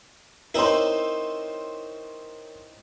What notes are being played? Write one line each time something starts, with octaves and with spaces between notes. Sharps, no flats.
C4 D#4 E4 A#4 C#5 C6